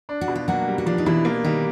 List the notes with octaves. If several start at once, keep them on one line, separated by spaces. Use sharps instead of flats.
D4
F#4
B2
F4
F#3 A#3 F#4
G3
F#4
F3 D4 F4
D#4
B2 E3 E4
A#3
D#3 G3 D#4